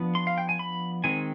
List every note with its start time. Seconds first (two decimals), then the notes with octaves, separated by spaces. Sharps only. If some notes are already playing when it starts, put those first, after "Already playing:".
Already playing: F3 B3 D4
0.15 C6
0.27 F5
0.38 G5
0.49 G#5
0.59 B5
1.04 D#3 G#3 C4 G#5